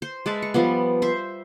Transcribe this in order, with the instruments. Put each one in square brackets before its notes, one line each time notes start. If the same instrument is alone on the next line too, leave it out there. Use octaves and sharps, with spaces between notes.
[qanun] C5
G#3 B4 E5 A5
C#6
F3 G3 B3
C5 E5